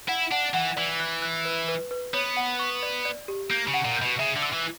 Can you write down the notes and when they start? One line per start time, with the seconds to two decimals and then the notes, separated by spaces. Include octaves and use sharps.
0.08 E4 F#5
0.32 D4 F#5
0.54 E3 F#5
0.76 E3 D5
1.00 F#6
1.22 F#6
1.45 B4
1.68 B4
1.91 B4
2.14 B3 C#5
2.37 F#5
2.59 C#6
2.83 D5
3.05 D5
3.28 G4
3.50 A#3 G6
3.67 C#3
3.74 F#5
3.85 A#2
3.97 G6
4.02 B2
4.19 C#3 E5
4.36 D3
4.42 E6
4.53 E3